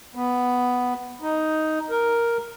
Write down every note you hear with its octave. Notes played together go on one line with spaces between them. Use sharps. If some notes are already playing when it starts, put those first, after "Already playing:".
B3
D#4
A#4